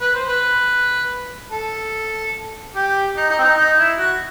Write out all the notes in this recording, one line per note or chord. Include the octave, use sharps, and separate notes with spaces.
B4
C5
B4
A4
G4
D#4
D#4
C4
D#4
D#4
E4
F#4